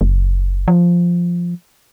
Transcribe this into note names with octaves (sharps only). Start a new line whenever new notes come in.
F#1
F3